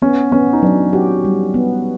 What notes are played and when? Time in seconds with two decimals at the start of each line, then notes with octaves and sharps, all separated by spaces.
0.02 B3 C#4
0.32 B3 C#4
0.53 D#4
0.62 F#3 D4
0.93 F#4 G4
1.24 G3
1.54 B3